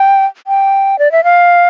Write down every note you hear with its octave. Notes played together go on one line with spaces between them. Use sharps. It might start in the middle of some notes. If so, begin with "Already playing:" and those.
Already playing: G5
G5
D5
E5
F5